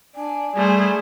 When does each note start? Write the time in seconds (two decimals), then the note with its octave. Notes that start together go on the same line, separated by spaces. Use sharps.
0.16 D4 G#5
0.56 G3 A3 G#4 C5